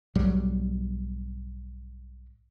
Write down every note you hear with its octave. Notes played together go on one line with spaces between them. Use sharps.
B1 G#2 F#3 G3